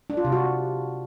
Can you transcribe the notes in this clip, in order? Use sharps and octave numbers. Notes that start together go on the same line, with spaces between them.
D4
F4
C3
F#4